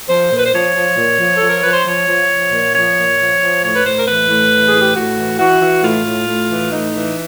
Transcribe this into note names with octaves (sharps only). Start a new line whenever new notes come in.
F3 C5
A#2
B4
C5
F3 C#5
F3
A#2
F3
F3 A4
A#4
F3 B4
C5
F3 C#5
F3
F3
A#2
F3 C#5
A#2
F3
F3
A2 C#5
B4
A2 C5
A#4
E3 B4
A2
E3
G#4
A2
G4
A2 F#4
E3
E3 F#4
E3
A2 F4
A2
A2
E3
A2 D#4
E3